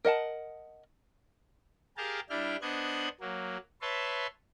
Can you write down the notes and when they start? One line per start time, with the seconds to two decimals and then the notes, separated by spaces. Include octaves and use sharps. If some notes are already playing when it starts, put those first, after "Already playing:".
0.05 A#4 D#5 F#5 A5
1.97 G4 G#4 A#4 F5 G5 A5
2.30 G3 D4 E4 G5 F6
2.62 B3 D4 C5 D#5 F#6 G#6
3.21 F#3 A#3
3.82 B4 C#5 E5 A5 C6